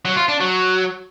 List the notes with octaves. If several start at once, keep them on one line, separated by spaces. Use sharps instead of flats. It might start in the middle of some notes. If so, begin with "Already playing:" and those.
F#3
F4
D4
F#3